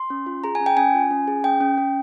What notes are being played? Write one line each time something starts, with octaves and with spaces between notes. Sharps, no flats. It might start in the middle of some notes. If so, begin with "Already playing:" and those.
Already playing: C6
C#4
F4
G#4 A#5
G#5
C#4
G5
C#4 G#5
F4
C#4
G#4
C#4 G5
C#4
C#4